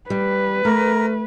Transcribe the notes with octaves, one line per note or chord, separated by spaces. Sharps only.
G3 B4
A3 A#4